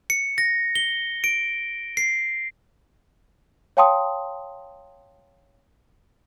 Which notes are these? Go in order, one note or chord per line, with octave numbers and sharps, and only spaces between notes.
C#7
A#6
G7
D7
C7
C#5 F5 G5 A5 C6 D#6